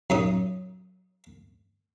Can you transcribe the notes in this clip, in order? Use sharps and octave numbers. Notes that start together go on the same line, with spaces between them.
F#2 D#4 D#6